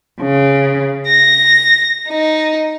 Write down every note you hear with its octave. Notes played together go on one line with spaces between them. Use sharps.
C#3
A#6
D#4